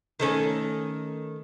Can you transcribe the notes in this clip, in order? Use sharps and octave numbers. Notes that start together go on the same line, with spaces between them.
D#3 A3 C#4